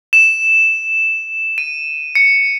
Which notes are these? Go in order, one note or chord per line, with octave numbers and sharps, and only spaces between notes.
E7
D#7
C#7